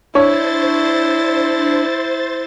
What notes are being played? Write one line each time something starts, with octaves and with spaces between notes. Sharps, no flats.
D4 E4 C5 C#5 A6